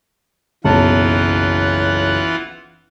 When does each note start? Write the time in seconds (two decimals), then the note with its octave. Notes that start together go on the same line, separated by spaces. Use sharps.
0.65 F#1 B1 E3 F4 F#5 A5